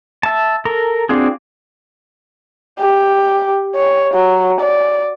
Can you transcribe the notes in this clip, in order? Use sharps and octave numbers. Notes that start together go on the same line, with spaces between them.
E5 A5
A4 A#4 A#5
C4 D4 F4 F#4 G#4
G4
C#5
F#3
D5